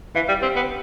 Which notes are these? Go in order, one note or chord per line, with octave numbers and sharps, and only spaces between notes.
E3 F5
G3
C4 G4
B3